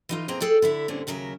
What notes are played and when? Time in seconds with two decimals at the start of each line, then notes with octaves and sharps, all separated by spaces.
0.09 E3 D#4 F4
0.28 B2 A#3 C4 G#4 A#5
0.40 G#4 A4 D5 G5
0.62 D3 E4 E5
0.88 G2 A#2 D3 C4 C#4
1.07 D#2 C#3 F#3 A#4 E5